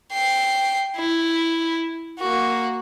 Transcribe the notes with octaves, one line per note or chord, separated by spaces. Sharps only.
G5 C7
E4
A#3 F#4